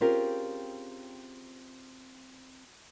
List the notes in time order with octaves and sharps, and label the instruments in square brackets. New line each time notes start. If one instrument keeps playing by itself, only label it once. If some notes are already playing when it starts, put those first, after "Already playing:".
[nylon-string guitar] C4 C#4 F4 G4 G#4 A#4